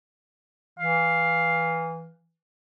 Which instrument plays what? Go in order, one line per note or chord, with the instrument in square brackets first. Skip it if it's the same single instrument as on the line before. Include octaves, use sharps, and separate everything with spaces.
[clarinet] E3 [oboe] F5